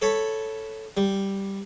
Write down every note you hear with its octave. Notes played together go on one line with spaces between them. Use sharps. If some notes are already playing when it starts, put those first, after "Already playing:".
A4 C#5 A5 B5
G3